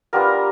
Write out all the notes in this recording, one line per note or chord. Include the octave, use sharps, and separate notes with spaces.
G3 B3 D4 F4 A#4